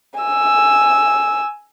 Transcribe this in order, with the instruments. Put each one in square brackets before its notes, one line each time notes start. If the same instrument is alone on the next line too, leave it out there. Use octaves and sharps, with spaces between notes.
[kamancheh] G#5 E6